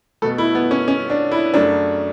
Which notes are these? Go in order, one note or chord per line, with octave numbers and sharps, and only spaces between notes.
B2 A3 A4
E4
B3
C#4
C#4
D4
E4
F#2 C#3 F#3 A3 D4